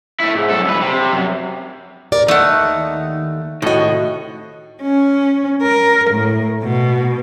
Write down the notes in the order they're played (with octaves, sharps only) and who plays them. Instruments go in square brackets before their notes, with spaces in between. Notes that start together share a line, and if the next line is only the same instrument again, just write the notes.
[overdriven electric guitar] A3 E4
G#2
B1 A4
C2 B4
C3
F#2
[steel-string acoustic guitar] A#4 D5
[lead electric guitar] D#2 D#3 [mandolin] A3 F#5 [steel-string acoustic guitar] D#4
[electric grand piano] A2 D#5 [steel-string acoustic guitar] C3 F#4 [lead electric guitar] D#3 A4
[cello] C#4
A#4
A2
B2